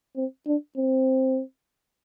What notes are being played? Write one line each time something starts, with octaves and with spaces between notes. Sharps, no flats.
C4
D4
C4